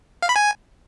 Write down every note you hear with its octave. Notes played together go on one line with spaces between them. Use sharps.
F5
B5
G#5